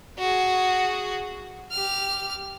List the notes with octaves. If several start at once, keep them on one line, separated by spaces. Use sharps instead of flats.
F#4 G#4
G4 F6